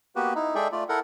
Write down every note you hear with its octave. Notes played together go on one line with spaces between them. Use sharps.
A#3 B3 F#4 G4 B4
D#4 E4
G#3 G#4 A4 D5 E5 G5
A3 F4 D5
E4 A4 A#4 F#5